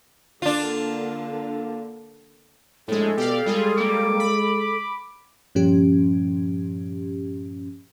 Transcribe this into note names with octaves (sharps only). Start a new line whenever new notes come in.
D3 A#3 D4 F4
A#1 A2 G#3 A4
B2 G4 D5 F5
G3 G#3 F4 G#4
G3 A#3 D6
B5
G2 A#2 F3 C#4 G4